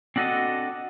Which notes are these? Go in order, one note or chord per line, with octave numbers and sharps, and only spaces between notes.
C4 D4 F#4 A4 D#5